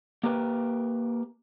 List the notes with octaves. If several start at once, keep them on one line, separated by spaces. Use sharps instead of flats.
A#3 G4 A#4 B4 G5